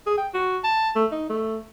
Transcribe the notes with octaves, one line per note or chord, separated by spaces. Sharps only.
G#4
G5
F#4
A5
A3
D#4
A3